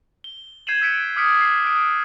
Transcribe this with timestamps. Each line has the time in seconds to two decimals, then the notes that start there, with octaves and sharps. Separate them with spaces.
0.24 G7
0.67 G6 G#6 C7 D#7 E7 F#7
0.81 E6 F#6 B6 C#7 D7
1.16 D6 D#6 F6 B6 C#7 D7
1.41 C7
1.66 D#6 D7